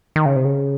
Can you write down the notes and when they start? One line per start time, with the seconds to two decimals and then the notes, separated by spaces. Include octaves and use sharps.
0.16 D#3
0.26 C#3
0.36 C3
0.45 C#3